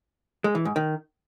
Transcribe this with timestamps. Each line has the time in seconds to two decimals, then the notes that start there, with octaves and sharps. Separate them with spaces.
0.44 G#3
0.55 E3
0.65 G#2
0.76 D#3